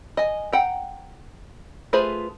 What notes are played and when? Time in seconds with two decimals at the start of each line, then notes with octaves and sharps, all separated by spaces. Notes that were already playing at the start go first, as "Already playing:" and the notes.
0.17 D#5 G#5
0.53 F#5 G5 A#5
1.93 A3 F4 G#4 B4 C5